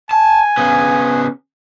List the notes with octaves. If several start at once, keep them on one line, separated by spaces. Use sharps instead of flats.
G#5 A5
C#3 B3